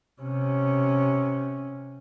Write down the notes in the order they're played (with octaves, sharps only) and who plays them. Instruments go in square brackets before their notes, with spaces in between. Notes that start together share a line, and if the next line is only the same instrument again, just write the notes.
[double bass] C3 C#4